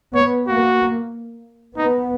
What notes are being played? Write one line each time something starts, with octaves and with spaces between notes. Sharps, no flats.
B3 C#5
A#3 F#4
B3 D#4